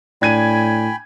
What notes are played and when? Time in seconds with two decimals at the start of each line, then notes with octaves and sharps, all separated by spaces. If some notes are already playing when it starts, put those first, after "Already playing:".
0.22 A2 D4 G5 G#5 B5 G#6 D#7